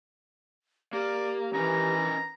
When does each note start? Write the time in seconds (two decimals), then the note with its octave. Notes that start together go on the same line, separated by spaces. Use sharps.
0.93 A#3 G4 D5
1.54 E3 C#4 D#4 A#4 A#5